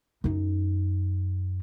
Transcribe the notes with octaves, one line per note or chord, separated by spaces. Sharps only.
F#2 D#4